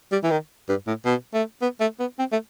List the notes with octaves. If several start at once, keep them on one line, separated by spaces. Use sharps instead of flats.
G3
E3
D#3
G2
A2
B2
A3
B3
A3
B3
C4
A3